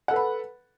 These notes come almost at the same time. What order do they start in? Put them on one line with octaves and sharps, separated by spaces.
F#5 A4 B4 B5